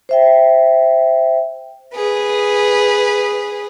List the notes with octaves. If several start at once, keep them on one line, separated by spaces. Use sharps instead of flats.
C5 E5 G5
G#4 B4